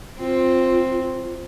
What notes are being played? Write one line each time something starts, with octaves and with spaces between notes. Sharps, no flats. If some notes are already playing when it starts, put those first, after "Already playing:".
C4 F4